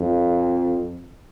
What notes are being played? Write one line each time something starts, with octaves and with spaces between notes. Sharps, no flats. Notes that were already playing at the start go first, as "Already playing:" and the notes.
Already playing: F2